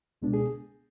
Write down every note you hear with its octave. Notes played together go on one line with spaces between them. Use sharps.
C#2 B2 G#3 B3 D4
G#4